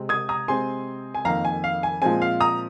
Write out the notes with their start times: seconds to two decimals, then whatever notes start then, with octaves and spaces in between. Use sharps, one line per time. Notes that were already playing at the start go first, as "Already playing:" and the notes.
Already playing: C3 G#3 C4
0.09 D#6 G#6
0.29 A#5 D#6
0.48 C3 G#3 C4 G#5 C6
1.15 G#5
1.25 F2 D#3 A#3 F5 A#5
1.45 G#5
1.64 F5
1.83 G#5
2.02 A#2 F3 G#3 C4 G#5
2.22 F5
2.41 A#5 D#6